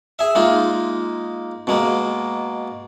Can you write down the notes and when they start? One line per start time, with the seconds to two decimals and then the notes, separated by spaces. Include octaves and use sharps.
0.19 G#4 E5
0.35 G#3 A#3 D#4 F4
1.67 B2 G#3 A#3